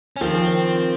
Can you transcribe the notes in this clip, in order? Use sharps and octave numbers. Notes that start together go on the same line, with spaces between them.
C#4
D#3 F3 C4